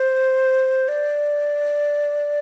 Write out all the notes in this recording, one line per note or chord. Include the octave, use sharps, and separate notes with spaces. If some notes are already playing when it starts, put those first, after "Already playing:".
Already playing: C5
D5